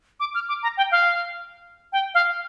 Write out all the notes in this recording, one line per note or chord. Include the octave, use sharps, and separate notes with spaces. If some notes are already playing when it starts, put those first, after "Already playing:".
D6
F6
D6
A#5
G5
F5
G5
F5